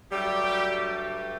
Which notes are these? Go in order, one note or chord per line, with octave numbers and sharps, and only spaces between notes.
G2 F#3 G3 A3 G4